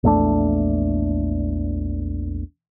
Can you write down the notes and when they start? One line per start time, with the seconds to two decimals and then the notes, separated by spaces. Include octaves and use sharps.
0.03 A#1 E2 A3 D4